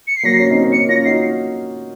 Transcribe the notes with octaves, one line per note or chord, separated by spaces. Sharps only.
C#7
C7
F#3 A#3 A#6
C7
A#3 C#4
C4 D#4
A#3 C#4
A#3 C#4 C#7
C#4 F4 A#6
D#4 F#4 C7